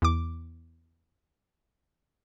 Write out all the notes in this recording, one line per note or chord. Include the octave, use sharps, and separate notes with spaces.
E2 D6